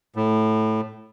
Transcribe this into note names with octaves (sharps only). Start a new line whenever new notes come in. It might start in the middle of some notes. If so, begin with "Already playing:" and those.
A2